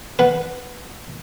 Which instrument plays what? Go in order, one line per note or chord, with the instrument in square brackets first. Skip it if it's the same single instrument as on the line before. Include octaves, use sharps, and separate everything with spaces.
[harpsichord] B4 F#5